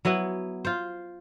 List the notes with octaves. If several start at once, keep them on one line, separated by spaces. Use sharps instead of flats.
F#3 B3 E4 B4
F4 C5